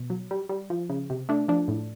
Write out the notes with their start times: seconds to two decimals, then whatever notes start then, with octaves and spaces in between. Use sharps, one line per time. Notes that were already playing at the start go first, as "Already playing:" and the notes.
Already playing: B2
0.10 F#3
0.31 G3
0.49 G3
0.70 F3
0.90 C#3
1.10 C3
1.29 A3 D4
1.48 F3 D4
1.68 A2